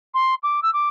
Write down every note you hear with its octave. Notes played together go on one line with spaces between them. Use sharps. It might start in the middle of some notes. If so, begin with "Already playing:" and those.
C6
D6
E6
D6